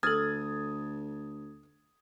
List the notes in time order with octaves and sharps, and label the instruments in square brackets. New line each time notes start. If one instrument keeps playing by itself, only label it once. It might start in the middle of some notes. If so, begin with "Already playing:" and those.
[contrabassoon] D2 [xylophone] A4 F6 [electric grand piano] D#6 G#6 A6